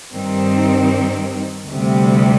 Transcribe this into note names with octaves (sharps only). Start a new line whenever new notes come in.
G2 D#3 G3 C4 D#4
D2 C3 G3